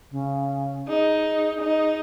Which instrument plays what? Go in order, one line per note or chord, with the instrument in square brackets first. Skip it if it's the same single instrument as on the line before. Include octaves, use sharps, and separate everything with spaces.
[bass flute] C#3
[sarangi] D#4 [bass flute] G#4
[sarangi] D#4